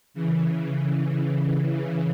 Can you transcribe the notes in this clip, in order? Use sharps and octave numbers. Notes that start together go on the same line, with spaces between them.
C#3 E3
C#3
C#3 E3